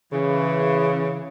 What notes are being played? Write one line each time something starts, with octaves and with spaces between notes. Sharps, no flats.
C#3 E3